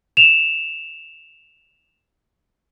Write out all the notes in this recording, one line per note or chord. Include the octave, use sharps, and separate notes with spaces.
E7 F7